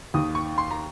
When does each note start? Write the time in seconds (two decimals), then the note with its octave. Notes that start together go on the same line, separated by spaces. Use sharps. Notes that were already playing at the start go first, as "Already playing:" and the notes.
0.14 D#2 D#3 D#6
0.35 C#6
0.58 C6
0.71 A#5